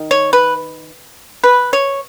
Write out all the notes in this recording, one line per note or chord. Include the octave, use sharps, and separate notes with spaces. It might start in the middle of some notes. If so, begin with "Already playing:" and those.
Already playing: D#3
C#5
B4
B4
C#5